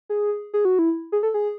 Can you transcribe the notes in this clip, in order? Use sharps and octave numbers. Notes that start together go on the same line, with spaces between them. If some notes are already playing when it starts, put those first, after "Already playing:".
G#4
G#4
F#4
E4
G#4
A4
G#4